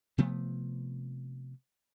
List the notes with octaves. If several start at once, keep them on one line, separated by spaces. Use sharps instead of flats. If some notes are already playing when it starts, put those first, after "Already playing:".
C3 F3 A3 B3